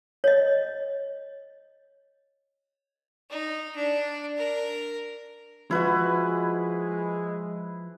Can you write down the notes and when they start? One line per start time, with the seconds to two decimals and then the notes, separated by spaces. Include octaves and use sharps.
0.24 C#5 D#5
3.30 D#4
3.76 D4
4.38 A#4
5.71 F3 G#3 E4 F#4 B4